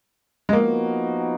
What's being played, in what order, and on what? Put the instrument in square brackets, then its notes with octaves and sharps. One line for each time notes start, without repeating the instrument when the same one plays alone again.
[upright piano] G#3
[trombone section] F3 B3 D#4 F#4 [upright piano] A#3